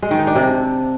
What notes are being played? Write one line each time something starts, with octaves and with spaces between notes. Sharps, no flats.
G#3
D#3
D#4
D4
C3